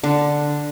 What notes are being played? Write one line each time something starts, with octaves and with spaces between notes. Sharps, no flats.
D3